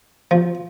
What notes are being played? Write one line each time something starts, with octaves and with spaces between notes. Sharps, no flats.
F3